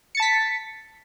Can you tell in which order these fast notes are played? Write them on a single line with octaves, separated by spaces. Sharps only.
C#7 A6 A5 B6